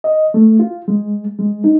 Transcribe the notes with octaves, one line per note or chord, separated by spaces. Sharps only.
D#5
A3
F4
G#3
G#3
D#4